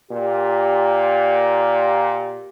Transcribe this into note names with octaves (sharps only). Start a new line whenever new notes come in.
A#2 G4